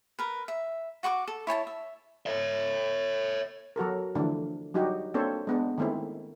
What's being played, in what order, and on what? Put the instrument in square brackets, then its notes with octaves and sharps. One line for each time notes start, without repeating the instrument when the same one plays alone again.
[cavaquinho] A#4 B4
E5
F#4 F#5 C#6 D6
A4
E4 C#5 G#5 A5
E5
[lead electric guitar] C#5 E5
[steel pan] F#3 F#4 A4 A#4
D3 E3 F3 A3 D4
F#3 G3 D#4 F#4 G4
A#3 C4 D4 A4 C5 C#5
G#3 B3 D4
D#3 G#3 A3 C4 E4